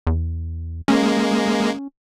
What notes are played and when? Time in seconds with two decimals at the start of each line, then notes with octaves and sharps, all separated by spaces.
0.07 E2
0.88 G#3 A#3 C#4